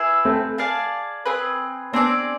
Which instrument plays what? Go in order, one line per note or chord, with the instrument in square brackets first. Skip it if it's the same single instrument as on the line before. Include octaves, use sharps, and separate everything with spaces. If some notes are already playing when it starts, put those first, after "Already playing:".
Already playing: [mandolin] E4 G#4 B4 E5
[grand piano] A3 C4
[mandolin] G#4 D5 F5 A5
C4 G#4 B4
[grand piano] B3 D4 [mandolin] C4 G#4 D5